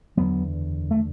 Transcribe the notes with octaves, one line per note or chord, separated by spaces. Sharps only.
F#1 E2 D3 F#3 B3
A3